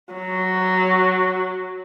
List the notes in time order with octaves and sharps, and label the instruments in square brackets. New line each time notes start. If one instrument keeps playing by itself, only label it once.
[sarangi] F#3